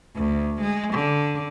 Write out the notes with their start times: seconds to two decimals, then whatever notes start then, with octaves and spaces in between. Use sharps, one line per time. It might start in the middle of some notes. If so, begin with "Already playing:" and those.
0.16 D2
0.61 G#3
0.94 D3